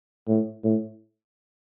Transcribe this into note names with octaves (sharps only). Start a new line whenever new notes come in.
A2
A2